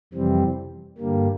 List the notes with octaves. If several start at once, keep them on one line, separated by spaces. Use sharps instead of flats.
F2 C3 E3 G3 C4
G2 D3 G3 A#3